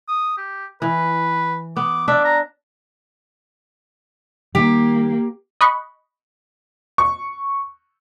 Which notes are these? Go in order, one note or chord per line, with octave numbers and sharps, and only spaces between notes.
D#6
G4
E3 B4
B3 D6
D4 E5 D6
A#5
D#3 G3 A#3 G4
D#5 B5 C#6 F#6
C#6